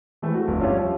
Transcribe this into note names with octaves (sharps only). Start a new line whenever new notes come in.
E3 G#3 A3 C4
F#4
G1 F2
C#4 F4 G4 C#5 E5
F3